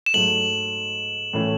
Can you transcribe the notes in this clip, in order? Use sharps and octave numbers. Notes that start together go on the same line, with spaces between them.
E7
G#2 F#3 A3 F#7
A2 E3 A3 C#4